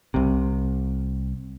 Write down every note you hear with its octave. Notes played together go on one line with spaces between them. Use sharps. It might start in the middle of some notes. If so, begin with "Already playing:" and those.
C2 C3